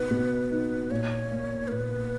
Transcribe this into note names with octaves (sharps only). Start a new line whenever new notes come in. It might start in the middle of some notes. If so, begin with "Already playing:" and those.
Already playing: B2 D#4 B4
B2
D#4
A#2 C#5
A#3
A#4
A#2 B4